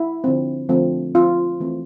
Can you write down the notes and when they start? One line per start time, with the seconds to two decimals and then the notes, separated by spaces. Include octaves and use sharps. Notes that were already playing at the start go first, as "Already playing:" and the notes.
Already playing: E4
0.24 D3 F3 C4
0.69 D3 F3 A3 C4
1.15 F3 C4 F4
1.60 E3 A3 C4